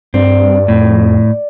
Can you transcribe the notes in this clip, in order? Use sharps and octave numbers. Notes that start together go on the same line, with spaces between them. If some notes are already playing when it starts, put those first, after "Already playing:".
G2 C4 D5
F2 A2